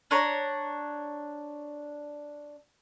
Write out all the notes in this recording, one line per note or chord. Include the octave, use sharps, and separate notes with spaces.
D4 C#5 A#5